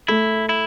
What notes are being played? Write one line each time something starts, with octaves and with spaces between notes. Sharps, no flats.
A3 E4
E4